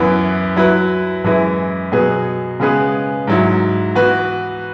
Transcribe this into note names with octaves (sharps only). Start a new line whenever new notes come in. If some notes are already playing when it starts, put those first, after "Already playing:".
Already playing: F#2 E3 B3 E4 B4
F#3 E4 B4
F#2 E3 G#3 E4
B2 F#3 B3 G#4 B4
C#3 G#3 B3 G#4 B4
G#2 F#3 E4
E3 B3 F#4 B4